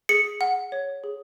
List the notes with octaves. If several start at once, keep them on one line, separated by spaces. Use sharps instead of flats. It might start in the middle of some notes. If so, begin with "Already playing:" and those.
G#4 C#7
F#5
C#5
G#4